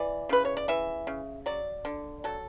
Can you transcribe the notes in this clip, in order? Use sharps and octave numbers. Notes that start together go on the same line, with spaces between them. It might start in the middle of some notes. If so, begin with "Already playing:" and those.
Already playing: E3 D5
C#3 B4
C#5
D5
E3 E5
C#3
F#3 D5
D3
F#3 A4